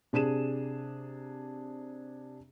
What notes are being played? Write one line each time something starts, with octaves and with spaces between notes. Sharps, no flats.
C3 D4 G#4 D#7 E7